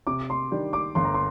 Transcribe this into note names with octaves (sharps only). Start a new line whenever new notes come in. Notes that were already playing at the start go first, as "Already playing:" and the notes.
C3 D6
C6
D#3 G3 D4 G4
D6
G1 C6
A#5
C6